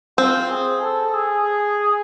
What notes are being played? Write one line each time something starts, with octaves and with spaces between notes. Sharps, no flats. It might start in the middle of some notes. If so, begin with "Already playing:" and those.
C4 F4
G#4
A4
G#4